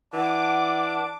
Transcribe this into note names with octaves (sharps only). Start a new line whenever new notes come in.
E3 D4 F#5 D6